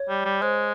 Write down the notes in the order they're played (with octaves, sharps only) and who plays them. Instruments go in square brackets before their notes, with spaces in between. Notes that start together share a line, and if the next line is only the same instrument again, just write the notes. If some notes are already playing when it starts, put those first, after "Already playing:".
Already playing: [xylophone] C#5
[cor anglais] G3
G3
[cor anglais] G#3 [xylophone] C5